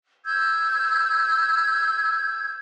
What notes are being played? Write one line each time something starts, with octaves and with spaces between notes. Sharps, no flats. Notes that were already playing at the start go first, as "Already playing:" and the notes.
E6 G6 G#6